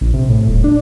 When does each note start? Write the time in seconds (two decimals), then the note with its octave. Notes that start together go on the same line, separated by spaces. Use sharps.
0.01 A#1
0.14 C3
0.29 A2
0.48 D#1
0.64 D4